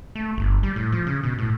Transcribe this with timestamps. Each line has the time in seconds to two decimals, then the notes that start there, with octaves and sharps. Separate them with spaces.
0.15 A3
0.37 G1
0.63 G3
0.76 A2
0.92 F3
1.07 C#3
1.24 B2
1.38 A2